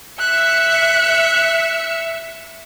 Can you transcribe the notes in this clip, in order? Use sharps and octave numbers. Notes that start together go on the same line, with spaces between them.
E5 F#6 C#7